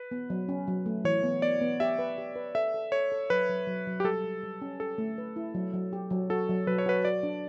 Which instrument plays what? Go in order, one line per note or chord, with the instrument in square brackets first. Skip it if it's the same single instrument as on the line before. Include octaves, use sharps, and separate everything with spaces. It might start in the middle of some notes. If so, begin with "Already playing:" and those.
Already playing: [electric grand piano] B4
[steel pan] B3
F#3
C#4
F#3
A3
[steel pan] E3 [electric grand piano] C#5
[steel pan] B3
[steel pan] B3 [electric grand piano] D5
[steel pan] B3
[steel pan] G4 [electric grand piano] E5
[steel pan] B4
G4
B4
[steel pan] A4 [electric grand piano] E5
[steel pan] A4
[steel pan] A4 [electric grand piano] C#5
[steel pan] A4
[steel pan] F#3 [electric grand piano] B4
[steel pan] F#3
F#3
F#3
[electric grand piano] G4
[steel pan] G3 [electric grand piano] A4
[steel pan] G3
G3
C#4
[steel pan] G4 [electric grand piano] A4
[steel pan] A3
B4
E4
F#3
F#3
G4
F#3
[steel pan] F#4 [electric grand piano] A4
[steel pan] F#3
[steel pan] F#3 [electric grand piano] B4
[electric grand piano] C#5
[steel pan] F#4 [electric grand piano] B4
[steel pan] F#4 [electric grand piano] D5
[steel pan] D4